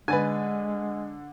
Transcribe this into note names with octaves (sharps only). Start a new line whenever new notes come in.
D3 G#3 B4 G#5 A6